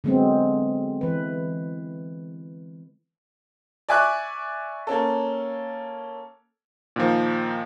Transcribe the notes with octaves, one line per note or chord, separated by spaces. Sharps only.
D3 F#3 G#3 B3 C4
E3 B4
D5 E5 G#5 C#6 D6 F#6
A#3 C#4 A4
A#2 D#3 F3